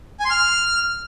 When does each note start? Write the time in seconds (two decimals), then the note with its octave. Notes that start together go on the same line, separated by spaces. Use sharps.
0.20 G#5
0.25 C6
0.30 F6